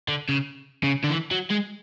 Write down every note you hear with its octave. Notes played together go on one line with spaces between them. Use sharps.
D3
C#3
C#3
D3
E3
F#3
G#3